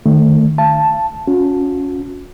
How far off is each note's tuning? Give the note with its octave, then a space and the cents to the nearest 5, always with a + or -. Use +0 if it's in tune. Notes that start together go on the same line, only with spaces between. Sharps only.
D#3 -35 A3 +0
F5 -40 A5 +0
C#4 +15 F#4 -40